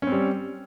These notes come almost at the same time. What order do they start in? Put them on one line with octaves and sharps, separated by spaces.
C#4 C4 G3